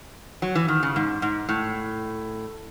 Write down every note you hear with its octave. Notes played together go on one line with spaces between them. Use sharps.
F#3
E3
D#3
C#3
G#2
G#2
A2